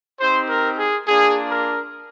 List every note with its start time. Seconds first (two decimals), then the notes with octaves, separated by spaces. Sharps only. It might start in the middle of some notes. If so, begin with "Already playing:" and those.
0.20 C4 D#4 G4 C5
0.49 A#4
0.79 G#4
1.08 A#3 D4 F4 G#4
1.51 A#4